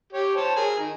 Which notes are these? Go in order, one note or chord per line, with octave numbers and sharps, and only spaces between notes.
G4 C#5
C5 C#5 A5
G#4 A#4 G#5
D#3